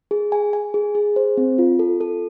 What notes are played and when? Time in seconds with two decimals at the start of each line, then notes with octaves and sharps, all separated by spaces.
0.11 G#4
0.32 G#5
0.53 G#5
0.74 G#4
0.95 G#4
1.16 C5
1.37 C4
1.58 F4
1.79 A4
2.01 A4